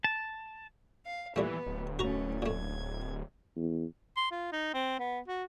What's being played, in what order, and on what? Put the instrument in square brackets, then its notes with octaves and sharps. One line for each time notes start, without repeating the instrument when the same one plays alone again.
[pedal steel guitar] A5
[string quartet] F5
[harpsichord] A#2 G3 A3 [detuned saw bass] E3 [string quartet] B3
[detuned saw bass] D1
[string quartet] A3 C#4 [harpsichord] F#4 A#5
[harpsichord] A#2 A3 [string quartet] G#6
[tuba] E2
[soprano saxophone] C6
F4
D#4
C4
B3
F#4